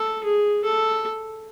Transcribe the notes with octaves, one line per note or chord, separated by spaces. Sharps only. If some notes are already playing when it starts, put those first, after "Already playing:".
Already playing: A4
G#4
A4